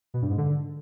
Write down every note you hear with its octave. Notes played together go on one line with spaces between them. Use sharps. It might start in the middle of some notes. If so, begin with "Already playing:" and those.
B2
G2
G#2
D3